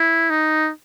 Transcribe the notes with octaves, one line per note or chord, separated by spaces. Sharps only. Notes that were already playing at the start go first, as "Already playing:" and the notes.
Already playing: E4
D#4